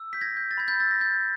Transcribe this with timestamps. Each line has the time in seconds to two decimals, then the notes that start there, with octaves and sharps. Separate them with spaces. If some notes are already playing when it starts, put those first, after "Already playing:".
Already playing: E6
0.13 G6 B6
0.21 G#6 A#6
0.37 G6
0.51 A6
0.57 B5 G#6
0.68 G6 A6
0.80 E6 A6
0.91 A#6
1.01 G6 A6